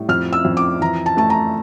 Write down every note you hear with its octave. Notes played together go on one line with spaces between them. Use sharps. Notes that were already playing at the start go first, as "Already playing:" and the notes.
Already playing: A2 G3
F2 F6
E6
F2
D6
E3 A#5
A5
A3 A5
A#5